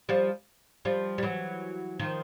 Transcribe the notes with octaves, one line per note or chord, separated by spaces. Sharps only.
F3 G3
F3 G3
G3
E3 F#3
D#3 F3